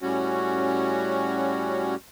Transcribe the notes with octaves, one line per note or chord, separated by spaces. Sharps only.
A2 G3 C#4 F#4